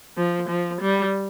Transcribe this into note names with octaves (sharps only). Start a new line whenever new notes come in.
F3
F3
G3